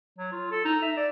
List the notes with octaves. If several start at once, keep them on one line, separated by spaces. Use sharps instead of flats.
F#3
F4
A4
D#4
E5
D5